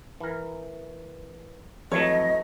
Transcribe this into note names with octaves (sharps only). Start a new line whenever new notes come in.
E3 A#4
F2 E3 F#3 A3 C#5 D#5